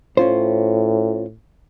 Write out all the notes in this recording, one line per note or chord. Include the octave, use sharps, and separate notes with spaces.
A2 C#4 F4 C5